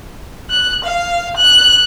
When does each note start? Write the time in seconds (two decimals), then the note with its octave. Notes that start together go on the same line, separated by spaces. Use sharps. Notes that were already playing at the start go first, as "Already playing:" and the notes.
0.50 F#6
0.83 F5
1.36 F#6